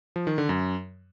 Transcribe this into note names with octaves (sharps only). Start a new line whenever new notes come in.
F3
D#3
D3
F#2